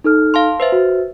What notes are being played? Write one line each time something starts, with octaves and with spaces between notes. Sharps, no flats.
D#4 A4 F6
F5 A5 C6
B4 C5 E5
F#4